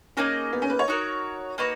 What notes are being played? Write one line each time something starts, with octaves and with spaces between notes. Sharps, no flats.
A#3 C#4 D#4 G#4
B3
C#4
B4
C#5
D#4 F#4 A#4
A#3 D#4 F#4 B4 C#5